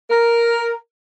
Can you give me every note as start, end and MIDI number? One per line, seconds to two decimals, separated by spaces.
0.09 0.72 70